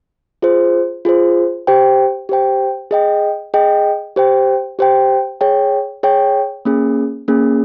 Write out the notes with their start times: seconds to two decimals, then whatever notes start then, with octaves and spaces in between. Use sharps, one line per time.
0.42 F4 G#4 C5
1.05 F4 G#4 C5
1.67 G4 C5 G5
2.29 G4 C5 G5
2.91 G#4 D#5 G5
3.54 G#4 D#5 G5
4.16 G4 C5 G5
4.79 G4 C5 G5
5.41 G#4 C#5 G5
6.03 G#4 C#5 G5
6.65 A#3 C#4 G#4
7.28 A#3 C#4 G#4